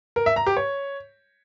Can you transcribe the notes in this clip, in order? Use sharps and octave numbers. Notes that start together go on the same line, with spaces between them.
A#4
E5
A#5
G4
C#5